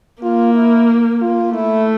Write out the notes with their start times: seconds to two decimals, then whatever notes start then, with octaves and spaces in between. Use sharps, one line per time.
0.22 A#3 F4
0.54 E4
1.22 F4
1.53 A3 E4